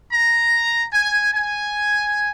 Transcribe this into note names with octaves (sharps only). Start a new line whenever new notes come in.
A#5
G#5
G#5